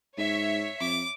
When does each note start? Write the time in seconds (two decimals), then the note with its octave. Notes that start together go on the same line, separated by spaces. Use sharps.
0.18 G#2 C#5 E5
0.80 F2 D6